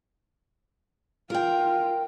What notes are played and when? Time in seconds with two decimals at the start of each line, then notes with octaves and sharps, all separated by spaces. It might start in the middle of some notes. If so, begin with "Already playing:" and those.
1.30 F4 A#4 G5